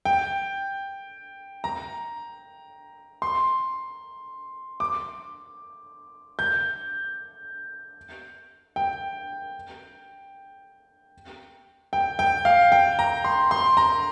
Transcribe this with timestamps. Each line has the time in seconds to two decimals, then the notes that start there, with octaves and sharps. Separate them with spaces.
0.05 G5
1.64 A#5
3.22 C6
4.80 D6
6.39 G6
8.76 G5
11.93 G5
12.19 G5
12.45 F5
12.72 G5
12.99 A#5
13.25 C6
13.51 C6
13.77 A#5